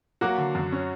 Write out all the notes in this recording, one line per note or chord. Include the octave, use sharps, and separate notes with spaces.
F#3 A#3 F#4
D3
F#2
C#4